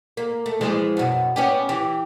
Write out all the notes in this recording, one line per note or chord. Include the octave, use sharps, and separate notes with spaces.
A#3
A3
E3 F3 G#3
F#2 B2
B3 C#4 G4
E3 G4